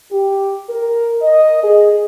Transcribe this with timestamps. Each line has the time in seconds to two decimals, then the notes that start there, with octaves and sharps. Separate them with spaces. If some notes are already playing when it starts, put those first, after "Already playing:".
0.11 G4
0.68 A#4
1.21 D#5
1.62 G#4